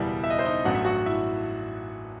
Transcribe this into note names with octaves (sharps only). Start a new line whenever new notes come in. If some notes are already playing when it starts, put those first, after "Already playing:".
Already playing: F#1 E2 B2 G3 E4 E5
E5
D#5
C5
D#4 D#5
A1 G2 F#3 A3 F#5
E5
F#4 F#5
E4 E5